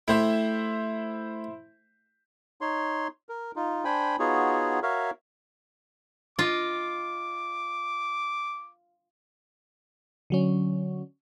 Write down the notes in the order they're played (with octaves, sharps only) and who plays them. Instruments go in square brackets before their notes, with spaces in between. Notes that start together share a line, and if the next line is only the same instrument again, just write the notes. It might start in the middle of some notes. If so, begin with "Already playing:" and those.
[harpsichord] A3 G4 [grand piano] E4 C5 E5
[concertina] D#4 C#5 C6
A#4
D#4 F4
D4 C5 G5 G#5 B5
B3 D#4 F4 F#4 G#4 C#5
F#4 A#4 C#5 E5 F5
[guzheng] F4 D#5 [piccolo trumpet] D6
[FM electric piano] D3 F#3 C#4